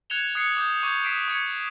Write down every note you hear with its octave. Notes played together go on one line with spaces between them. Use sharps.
F#6 G#6 C#7 E7 F7 G7
D#6 F#6 G#6 C7 C#7
D6 D#6 G6
C#6 D6 G6 G#6
D#6 B6 C7 D7 E7
C#6 G#6 C#7